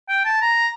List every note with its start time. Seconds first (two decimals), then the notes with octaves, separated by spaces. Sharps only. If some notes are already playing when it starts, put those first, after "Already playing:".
0.09 G5
0.25 A5
0.41 A#5